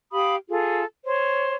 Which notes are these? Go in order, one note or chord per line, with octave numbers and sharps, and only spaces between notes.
G4 F5 B5 D#6
F4 G#4 A4
C5 C#5